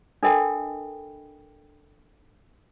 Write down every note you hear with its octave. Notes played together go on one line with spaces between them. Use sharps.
D4 A4 A#4 D#5 G5 B5